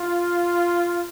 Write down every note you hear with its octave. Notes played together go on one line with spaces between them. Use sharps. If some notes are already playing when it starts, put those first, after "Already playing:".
Already playing: F4